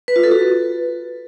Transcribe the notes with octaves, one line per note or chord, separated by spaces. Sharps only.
B4
F4
A4
F#4
B4